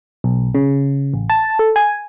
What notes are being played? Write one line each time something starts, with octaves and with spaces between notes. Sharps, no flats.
B1
C#3
A1
A5
A4
G#5